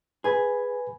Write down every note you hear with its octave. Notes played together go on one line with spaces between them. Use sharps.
G#4 B4 G#5 B5